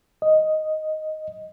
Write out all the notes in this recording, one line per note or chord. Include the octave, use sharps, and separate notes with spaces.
D#5